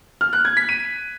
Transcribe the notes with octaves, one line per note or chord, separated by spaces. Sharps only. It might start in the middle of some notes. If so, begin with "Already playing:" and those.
F6
F#6
G#6
B6
D#7